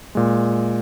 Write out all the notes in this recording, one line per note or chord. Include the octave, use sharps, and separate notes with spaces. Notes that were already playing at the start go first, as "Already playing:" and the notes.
A#2 G#3